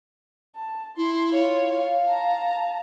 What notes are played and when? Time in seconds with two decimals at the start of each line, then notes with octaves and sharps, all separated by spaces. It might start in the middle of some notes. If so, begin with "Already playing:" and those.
0.56 A5
0.97 E4 C6
1.31 F4 C#5
1.71 F5
2.08 A5 A#5